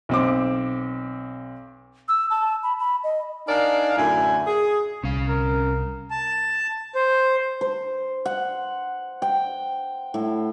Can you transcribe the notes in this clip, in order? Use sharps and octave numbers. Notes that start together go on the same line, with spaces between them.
B1 C4 D6
E6
A5
B5
B5
D#5
D4 D#4 A#4 D5 F5 G#5
F#2 A2 D3 E4 G#5
G#4
C2 C#4 F5
A#4
A5
C5
C5
F#5
G5
A2